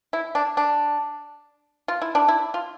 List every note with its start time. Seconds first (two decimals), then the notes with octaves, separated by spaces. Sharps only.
0.13 E4
0.35 D4
0.57 D4
1.88 F4
2.02 E4
2.15 D4
2.28 E4
2.54 F4